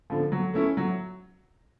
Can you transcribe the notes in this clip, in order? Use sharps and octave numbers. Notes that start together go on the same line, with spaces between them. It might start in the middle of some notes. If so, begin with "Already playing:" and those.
D3 F3
F#3
A3 C#4 E4
F#3